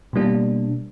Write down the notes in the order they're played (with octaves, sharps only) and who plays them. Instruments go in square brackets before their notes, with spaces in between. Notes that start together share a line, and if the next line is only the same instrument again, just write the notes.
[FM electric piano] B2 G3 A#3 D4